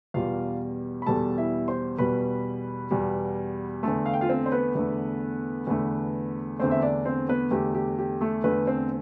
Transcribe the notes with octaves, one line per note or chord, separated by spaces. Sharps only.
E2 B2 G3 F4 F5
B5
E2 B2 G3 A4 A5
E4 E5
C5 C6
E2 B2 G3 B4 B5
E2 B2 G3
E2 D3 A3 A4 A5
F5
G5
F4 F5
C4 C5
C5
B3 B4
E2 D3 A3
E2 D3 A3
E2 D3 A3 C4 C5
E5
D4 D5
C4 C5
B3 B4
E2 D3 A3 G4
G4
G4
A3 A4
E2 D3 A3 B3 B4
C4 C5